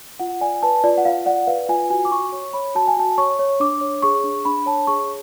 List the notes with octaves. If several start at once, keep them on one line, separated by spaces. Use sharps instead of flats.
F4 F#5
D5 G#5
B4 A5
F4 D5
F#5
F4 F5
D5 F#5
B4 F5
F4 G#5
F#4 G#5
D6
F#4 C#6
C#5 C#6
C#5 B5
F#4 A5
G#5
F#4 A5
C#5 C#6
C#5
D4 D6
C#5
G#4 C#6
D4
D4 B5
C#5 A5
G#4 C#6